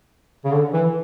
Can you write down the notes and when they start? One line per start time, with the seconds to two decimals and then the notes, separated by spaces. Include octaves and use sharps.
0.45 C#3
0.52 D3
0.74 E3